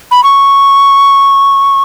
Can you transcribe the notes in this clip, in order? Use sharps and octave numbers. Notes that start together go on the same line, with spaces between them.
B5
C#6